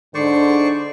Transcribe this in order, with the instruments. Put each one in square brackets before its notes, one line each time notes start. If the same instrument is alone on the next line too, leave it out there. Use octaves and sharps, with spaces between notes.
[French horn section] G#2 D3 [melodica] C5 D5 C#6